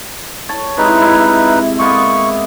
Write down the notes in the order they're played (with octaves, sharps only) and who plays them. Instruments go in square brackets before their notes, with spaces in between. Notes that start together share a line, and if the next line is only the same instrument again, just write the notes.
[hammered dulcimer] C#5 A5
[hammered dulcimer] C3 G#3 E4 [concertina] D#4 B4
[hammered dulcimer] C3 E4
[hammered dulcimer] G#3 A#3 B3 [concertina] C#6